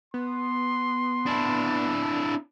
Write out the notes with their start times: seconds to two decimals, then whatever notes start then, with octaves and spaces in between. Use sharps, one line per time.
0.14 B3 C6
1.26 D4 E4